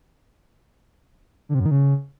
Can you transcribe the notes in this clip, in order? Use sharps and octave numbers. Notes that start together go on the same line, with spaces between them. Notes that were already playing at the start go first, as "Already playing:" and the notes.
D3
C3
F#2
D#3
C#3